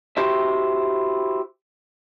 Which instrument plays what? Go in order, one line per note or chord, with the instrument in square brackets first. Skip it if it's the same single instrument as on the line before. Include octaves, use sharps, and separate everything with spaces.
[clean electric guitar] E4 F#4 G4 C5 D#5 E5